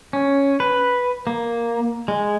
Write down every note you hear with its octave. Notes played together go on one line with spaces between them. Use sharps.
C#4
B4
A#3
G#3